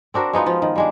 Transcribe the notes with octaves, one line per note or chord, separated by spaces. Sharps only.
C4 D4 F#4 A#4
G#3 B3 D#4 F4
F3 F4
D#3
G3 G#3 D4